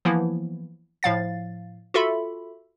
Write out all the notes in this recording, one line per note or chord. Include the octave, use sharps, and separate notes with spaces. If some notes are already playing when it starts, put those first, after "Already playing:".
E3 F3 A#3 B3 E4
A2 F3 F5 A6
F4 F#4 A4 E5 B5